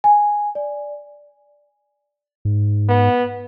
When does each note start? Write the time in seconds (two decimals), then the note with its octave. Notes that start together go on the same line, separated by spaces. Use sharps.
0.04 G#5
0.55 D5
2.45 G#2
2.89 B3